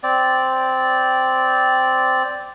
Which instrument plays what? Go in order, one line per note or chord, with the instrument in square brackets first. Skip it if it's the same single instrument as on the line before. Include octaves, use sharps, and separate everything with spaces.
[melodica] C4 D5